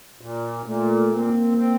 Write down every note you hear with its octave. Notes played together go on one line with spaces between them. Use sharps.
A#2
A#2 A3
A#3 C4
C4